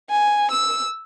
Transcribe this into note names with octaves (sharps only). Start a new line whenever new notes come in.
G#5
E6